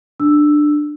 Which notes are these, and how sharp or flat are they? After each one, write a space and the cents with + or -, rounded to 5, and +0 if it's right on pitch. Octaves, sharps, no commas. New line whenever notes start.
D4 +15 E6 +0